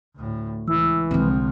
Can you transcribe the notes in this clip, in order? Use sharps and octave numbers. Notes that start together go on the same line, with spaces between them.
D2 A2
C#2 E3 E6
C2 D3 F3 G#3 C4